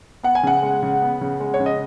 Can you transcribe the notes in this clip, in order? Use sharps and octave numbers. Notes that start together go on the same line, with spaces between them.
B3 F#5
G#5
C#3 F#5
G#3
C#3
B3
C#3
G#3
C#5
C#3
D#5